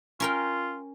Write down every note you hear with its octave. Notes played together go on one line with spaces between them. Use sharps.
C#4 F4 A#4 G5